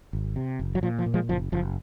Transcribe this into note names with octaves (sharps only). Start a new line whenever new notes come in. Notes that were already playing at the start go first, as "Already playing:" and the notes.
G#1
C3
F#1
F#3
A#2 F3
F3
A#2
F3 G#3
F#1 F3
F#1 F3